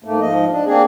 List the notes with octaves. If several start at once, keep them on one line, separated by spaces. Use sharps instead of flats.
G#2 A3 A#3
G#2 F3 D#5
D4
A#3 C4 D4 G#4